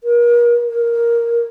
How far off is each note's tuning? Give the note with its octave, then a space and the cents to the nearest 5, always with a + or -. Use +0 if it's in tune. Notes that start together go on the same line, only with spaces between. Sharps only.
A#4 +35
A#4 +5